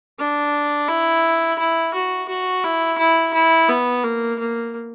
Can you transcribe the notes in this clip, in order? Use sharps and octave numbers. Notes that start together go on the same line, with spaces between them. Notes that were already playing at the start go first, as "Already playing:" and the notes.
D4
E4
E4
F#4
F#4
E4
E4
E4
B3
A#3
A#3